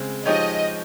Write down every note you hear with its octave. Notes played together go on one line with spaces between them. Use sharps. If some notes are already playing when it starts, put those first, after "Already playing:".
Already playing: C#3 G#3 C4
F3 G#3 D#4 G4 C#5 D#5